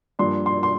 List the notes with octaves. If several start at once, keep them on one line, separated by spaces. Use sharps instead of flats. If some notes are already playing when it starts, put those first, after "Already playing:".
G2 F3 A#3 D4 C6
C6
C6